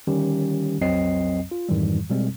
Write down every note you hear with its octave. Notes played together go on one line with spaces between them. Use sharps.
D3 D#3 G3 C#4 G4
B1 F2 F#3 C4 D#5 C7
F4
F2 G#2 D#3 E3 G3
B2 G3 G#3 C4